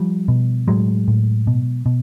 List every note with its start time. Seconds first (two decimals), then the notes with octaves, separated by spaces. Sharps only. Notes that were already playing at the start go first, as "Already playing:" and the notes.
Already playing: F3 G3
0.28 B2
0.68 A2 F#3 G#3
1.08 A2
1.47 B2
1.86 B2